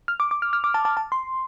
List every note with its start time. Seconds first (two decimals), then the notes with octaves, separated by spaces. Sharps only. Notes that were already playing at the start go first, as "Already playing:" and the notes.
0.08 F6
0.20 D6
0.31 D6
0.42 F6
0.53 F6
0.64 D6
0.74 A5
0.85 A5
0.97 A5
1.12 C6